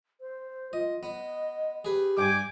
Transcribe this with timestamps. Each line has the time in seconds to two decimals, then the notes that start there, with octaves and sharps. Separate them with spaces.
0.21 C5
0.73 F4 D#5
1.03 B3 D#5
1.85 G4 G#4 B4
2.18 G2 G5 G#5 D6